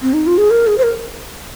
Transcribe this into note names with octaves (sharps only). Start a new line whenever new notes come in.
C4
D#4
F4
G#4
A#4
G#4
C5
A#4